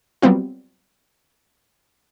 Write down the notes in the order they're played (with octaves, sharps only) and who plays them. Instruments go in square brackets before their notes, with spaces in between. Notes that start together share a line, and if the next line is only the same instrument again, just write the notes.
[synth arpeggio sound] F#3 G3 B3 C4 F4